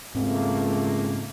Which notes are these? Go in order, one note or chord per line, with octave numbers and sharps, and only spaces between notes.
C#2 G#2 A3 A#3 C4